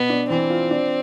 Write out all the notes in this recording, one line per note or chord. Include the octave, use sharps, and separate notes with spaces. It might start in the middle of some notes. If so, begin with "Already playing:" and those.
Already playing: B2 B3
D4
E3 C4
F4
D4